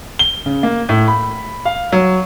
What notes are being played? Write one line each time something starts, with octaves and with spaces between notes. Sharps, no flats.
G7
C#3
A#3
A2
B5
F5
F#3